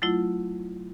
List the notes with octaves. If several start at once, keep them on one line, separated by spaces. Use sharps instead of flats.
F#3 A3 E4 F4